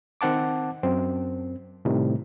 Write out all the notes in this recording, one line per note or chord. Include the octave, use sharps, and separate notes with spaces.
D#3 C4 F#5 A5 D6
F#2 C4
A2 C3 D#3 G3